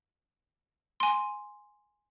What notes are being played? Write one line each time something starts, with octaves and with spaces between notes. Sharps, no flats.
G#5 C6